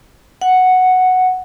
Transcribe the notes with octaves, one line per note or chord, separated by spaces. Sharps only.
F#5